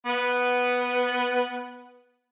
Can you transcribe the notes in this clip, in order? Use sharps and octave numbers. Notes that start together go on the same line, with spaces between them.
B3 B4